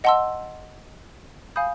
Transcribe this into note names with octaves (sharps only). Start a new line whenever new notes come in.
D#5 F#5 A5 C6 E6
F5 G#5 B5 D#6 G6